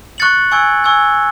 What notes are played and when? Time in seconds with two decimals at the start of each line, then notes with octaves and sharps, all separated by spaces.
0.18 C#6 F#6 A6 C#7 F#7
0.52 G#5 C#6 E6 G#6
0.84 G#5 C#6 E6 G#6